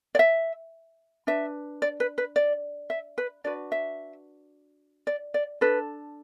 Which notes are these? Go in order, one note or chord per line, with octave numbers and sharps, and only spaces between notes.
D5
E5
D4 B4 E5
D5
B4
B4
D5
E5
B4
D4 F#4 B4 D5
E5
D5
D5
D4 A4 B4